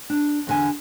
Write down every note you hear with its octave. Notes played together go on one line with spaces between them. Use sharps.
D4
E2 D3 G#5